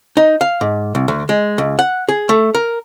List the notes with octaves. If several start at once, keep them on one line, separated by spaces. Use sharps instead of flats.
D#4
F5
G#2
C2
D2
G#3
C#2
F#5
G#4
A3
A#4